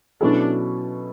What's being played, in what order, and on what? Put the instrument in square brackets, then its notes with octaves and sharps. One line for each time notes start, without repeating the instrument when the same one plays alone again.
[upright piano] B2 F#3 C#4 E4 A4 [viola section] D4